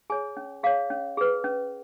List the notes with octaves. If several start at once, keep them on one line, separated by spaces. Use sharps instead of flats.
G#4 C#5 G#5
C#4
G#4 C#5 F5
C#4
G#4 B4
C#4